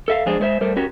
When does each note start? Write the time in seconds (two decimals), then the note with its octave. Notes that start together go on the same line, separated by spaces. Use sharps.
0.08 A4 E5 F5
0.26 F3 G#3 D4 G#4 C5
0.40 G#3 A3 C5 E5
0.61 G3 A3 A#4 C5
0.77 C#4 F#4 G4 A#4